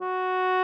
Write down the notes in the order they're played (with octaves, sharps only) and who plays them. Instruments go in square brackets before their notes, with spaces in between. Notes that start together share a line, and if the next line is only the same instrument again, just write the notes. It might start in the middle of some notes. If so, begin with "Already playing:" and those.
[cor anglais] F#4